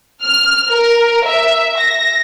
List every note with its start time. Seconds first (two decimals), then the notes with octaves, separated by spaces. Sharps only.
0.23 F6
0.71 A#4
1.27 E5
1.79 A#6